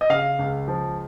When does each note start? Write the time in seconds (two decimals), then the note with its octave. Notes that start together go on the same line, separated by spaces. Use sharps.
0.01 D#5
0.10 C#3 F5
0.39 C#2
0.68 F3